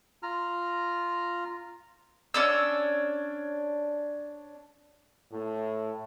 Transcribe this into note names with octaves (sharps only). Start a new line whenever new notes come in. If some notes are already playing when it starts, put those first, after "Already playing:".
F4 A#5 F6
C#4 D4 E6
A2